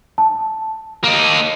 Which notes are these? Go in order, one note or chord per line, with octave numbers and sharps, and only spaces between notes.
A5
A#3 D#4